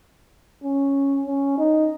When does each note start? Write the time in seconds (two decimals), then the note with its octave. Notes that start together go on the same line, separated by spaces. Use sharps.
0.63 C#4
1.27 C#4
1.58 D#4